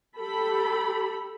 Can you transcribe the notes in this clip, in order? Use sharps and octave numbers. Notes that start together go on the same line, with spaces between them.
G4 A4 B5